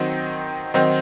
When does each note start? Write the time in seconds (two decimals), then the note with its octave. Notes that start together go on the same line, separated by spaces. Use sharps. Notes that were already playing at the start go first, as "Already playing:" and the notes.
Already playing: D#3 F#3 C4 D#4
0.74 D#3 F#3 C4 D#4